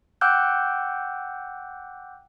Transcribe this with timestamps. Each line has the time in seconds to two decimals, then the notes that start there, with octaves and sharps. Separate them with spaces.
0.21 F#5 G5 D6 E6 F#6 G6